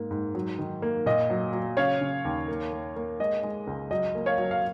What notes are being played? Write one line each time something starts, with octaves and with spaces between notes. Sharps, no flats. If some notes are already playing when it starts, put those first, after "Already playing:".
Already playing: G#2 A#3
G#2
F#3
D#3
A#3
A#2 D#5
F#3
F#3
C#3 C#5 F5
C#3
D#2
A#3
A#3
A#3
G#3 D#5
G#3
C#2
F#3 D#5
A#3
C#5 F5
F#3
F5